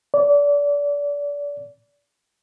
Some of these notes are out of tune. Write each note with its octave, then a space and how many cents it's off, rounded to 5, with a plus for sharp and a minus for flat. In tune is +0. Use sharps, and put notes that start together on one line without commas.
D5 -30